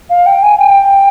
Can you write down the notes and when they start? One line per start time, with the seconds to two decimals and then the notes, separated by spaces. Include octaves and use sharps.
0.09 F5
0.26 G5
0.42 G#5
0.58 G5